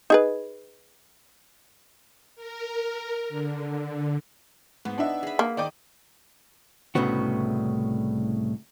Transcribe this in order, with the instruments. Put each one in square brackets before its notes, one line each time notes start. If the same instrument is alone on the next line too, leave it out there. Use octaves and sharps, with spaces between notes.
[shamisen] D#4 G#4 B4
[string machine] A#4
D3
[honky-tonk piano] G#2 [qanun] B3
[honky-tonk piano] D4 D#4 E5
[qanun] G#4 B5
[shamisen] A#3
[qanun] D#3 D#5 [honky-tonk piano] D5 G5 D6
[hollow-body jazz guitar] C2 A2 C#3 B3 F#4